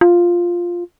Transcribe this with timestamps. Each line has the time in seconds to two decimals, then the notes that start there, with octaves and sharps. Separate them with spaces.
0.01 F4